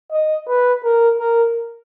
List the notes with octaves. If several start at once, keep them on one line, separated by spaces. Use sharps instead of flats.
D#5
B4
A#4
A#4